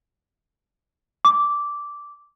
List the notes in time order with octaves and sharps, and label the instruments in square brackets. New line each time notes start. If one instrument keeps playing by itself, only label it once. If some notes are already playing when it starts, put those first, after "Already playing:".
[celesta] D6